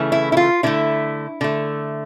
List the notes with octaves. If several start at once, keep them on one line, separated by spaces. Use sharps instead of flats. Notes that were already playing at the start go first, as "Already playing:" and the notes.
Already playing: C#3 E3 A3
E4
E4
F4
D3 A3 E4
D3 A3